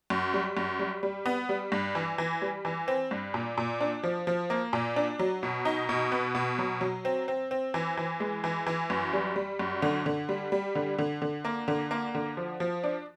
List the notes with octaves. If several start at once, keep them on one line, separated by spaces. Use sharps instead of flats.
F#2
G3
F#2
G3
G3
B3
G3
G2
E3
E3
G3
E3
C4
G2
A#2
A#2
D4
F3
F3
A#3
A#2
D4
F#3
B2
D#4
B2
B3
B2
F#3
F#3
C4
C4
C4
E3
E3
G#3
E3
E3
F#2
G3
G3
F#2
D3
D3
G3
G3
D3
D3
D3
A#3
D3
A#3
D3
F3
F3
D4